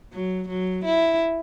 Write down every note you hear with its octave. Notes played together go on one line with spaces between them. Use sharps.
F#3
F#3
E4